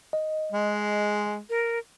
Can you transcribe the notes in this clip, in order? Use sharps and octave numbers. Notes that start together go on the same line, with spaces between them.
D#5
G#3
A#4